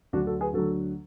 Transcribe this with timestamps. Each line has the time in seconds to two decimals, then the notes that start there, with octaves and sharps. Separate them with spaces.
0.13 D2 D3 F#3 D4 F#4
0.27 F#4 A4
0.40 G#4 B4
0.53 D2 D3 F#3 F#4 A4